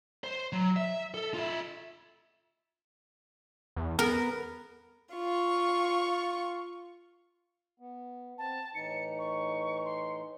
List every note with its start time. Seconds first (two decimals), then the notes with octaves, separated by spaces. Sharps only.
0.24 C5
0.53 F#3
0.76 E5
1.14 A4
1.34 F4 E5
3.76 E2
3.99 B3 A#4
5.13 F4 C#6
7.80 B3
8.38 C4 A5
8.75 A2 E3 D#4 C#7
9.19 C#6
9.85 C6